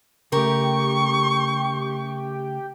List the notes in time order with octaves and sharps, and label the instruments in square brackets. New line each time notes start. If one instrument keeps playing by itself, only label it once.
[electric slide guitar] C#3 A3 [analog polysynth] G4 G5 [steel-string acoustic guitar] A#4 [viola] C#6